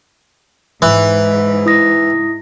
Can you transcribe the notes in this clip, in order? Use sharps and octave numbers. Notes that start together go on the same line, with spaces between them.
G#2 E3
E4 D#6 A#6